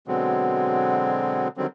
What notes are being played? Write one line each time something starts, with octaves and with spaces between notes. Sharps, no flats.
B2 D3 F#3 G#3 B3 C4
D3 D#3 F#3 G3 C4